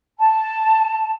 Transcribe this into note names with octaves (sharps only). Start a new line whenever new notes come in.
A5